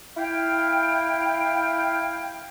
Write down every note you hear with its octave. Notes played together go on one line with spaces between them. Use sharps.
E4 F5 G5